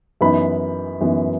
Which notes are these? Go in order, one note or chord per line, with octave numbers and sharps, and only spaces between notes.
F#2 E3 B3 D#4 B5
F#2 E3 B3 D#4